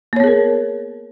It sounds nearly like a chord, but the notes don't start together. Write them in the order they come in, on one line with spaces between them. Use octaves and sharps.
A#3 C#5 B3 G#4 A#4